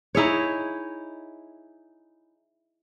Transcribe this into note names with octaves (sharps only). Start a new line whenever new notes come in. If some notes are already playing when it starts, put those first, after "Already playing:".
D#4 E4 G#4 C#5